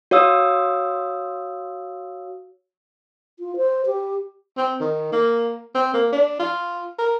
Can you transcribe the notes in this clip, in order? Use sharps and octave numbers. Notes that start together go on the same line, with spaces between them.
F#4 C#5 F5 D#6 E6
F4
C5
G4
C4
D#3
A#3
C4
A#3
D4
F4
A#4